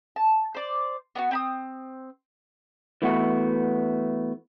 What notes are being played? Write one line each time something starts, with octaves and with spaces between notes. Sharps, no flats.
A5
C5 D5
B3 D4 F#4
C4 B5 D#6
E3 A3 B3 F#4